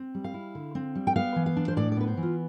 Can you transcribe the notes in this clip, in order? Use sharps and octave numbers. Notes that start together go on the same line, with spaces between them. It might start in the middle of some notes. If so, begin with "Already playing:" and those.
Already playing: C4
G3
F5
E4
D3
C4
G3
G5
B3 F5
E3
F5
D4
C5
A2 D5
D5
B3 B4
C5
E3
F4